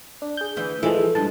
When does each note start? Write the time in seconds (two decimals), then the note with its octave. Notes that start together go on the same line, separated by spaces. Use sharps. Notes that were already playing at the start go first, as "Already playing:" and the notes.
0.22 D4
0.37 G#4 G6
0.56 D2 E3 E4
0.83 E3 F3 G#3 A4
1.15 G2 G#3 A5